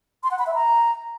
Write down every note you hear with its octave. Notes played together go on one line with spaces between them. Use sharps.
C6
F#5
B5
E5
A#5